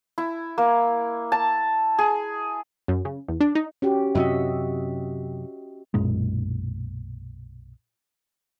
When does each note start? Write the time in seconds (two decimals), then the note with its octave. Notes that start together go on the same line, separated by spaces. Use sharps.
0.18 E4
0.58 A#3
1.32 A5
1.99 G#4
2.88 F#2
3.05 C#3
3.28 E2
3.40 D4
3.55 D#4
3.82 C#4 F#4 G4
4.15 F#2 C3 C#4 F#4 D#5 E5
5.94 B1 F#2 A#2 G#3